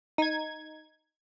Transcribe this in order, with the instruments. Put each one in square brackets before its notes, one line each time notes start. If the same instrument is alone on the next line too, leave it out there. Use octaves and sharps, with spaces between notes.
[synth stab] D#4 G#6